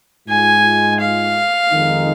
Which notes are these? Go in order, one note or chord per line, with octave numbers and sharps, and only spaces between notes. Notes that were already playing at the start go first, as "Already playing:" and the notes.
G#2 G#3 F4 G#5
F5
F2 D#3 G#3 D#4